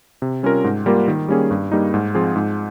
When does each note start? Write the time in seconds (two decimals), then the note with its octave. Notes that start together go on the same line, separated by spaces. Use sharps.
0.22 C3
0.43 G3 C#4 F4 A#4
0.64 G#2
0.86 G3 A#3 F4 A#4
1.08 D#3
1.28 G3 A#3 C#4 G#4
1.51 G2
1.72 G3 A#3 D#4
1.94 G#2
2.15 F3 C4 F4 G#4
2.36 G#2